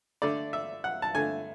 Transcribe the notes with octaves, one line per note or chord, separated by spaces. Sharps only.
D3 A3 D5
E5
F#5
A5
D3 A3 G#5